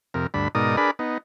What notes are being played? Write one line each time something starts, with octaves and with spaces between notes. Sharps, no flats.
F2 C3 A#4
D2 G2 D4 B5
G#2 B2 D#4 A#4 D5 D#6
D4 G#4 A#4 B4 D5 B5
B3 D#4